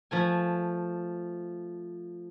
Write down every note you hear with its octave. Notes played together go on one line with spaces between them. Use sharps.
F3 A3 G#5